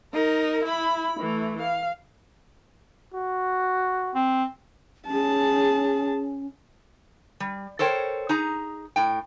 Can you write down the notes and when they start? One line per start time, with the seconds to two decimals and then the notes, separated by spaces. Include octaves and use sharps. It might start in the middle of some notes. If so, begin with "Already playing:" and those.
0.14 D#4 A#4
0.65 E4 B5
1.20 E3 A3
1.62 F5
3.14 F#4
4.15 C4
5.07 C#4 G#4 A5
7.40 G3
7.79 A4 A#4 C5 C#5 G5
8.29 D#4 G#4 A#5
8.96 A2 G5